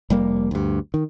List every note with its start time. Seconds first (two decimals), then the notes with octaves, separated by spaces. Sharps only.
0.10 F1 G3 A#3
0.51 D2 G2
0.94 D#3